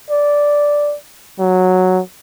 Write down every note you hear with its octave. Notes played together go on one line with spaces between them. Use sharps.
D5
F#3